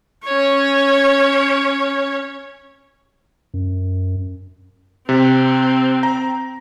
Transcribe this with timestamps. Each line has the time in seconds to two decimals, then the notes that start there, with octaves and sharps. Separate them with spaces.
0.25 C#4 C#5
3.54 F#2
5.09 C3 C4
6.03 A#5